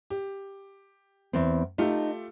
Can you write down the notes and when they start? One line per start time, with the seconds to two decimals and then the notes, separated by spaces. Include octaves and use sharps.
0.10 G4
1.33 E2 C4
1.78 A3 D#4 F4 G4